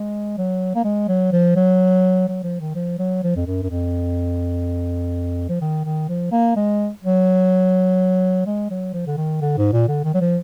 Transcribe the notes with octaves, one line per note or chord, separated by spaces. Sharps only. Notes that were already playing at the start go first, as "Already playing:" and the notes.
Already playing: G#3
F#3
A#3
G#3
F#3
F3
F#3
F#3
F3
D#3
F3
F#3
F3
F2
F#2
F#2
F2
F3
D#3
D#3
F3
A#3
G#3
F#3
G#3
F#3
F3
D3
D#3
D3
G#2
A#2
D3
D#3
F#3
F3